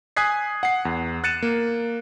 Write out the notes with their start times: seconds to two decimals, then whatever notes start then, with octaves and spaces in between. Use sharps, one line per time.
0.17 G#5 D#6 F#6 G#6 B6 C7
0.63 F#5 C7
0.85 E2
1.24 F#6 A6 C#7 D#7 E7
1.43 A#3